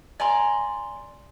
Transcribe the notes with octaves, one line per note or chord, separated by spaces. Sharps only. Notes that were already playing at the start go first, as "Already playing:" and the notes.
D5 G#5 A#5 C6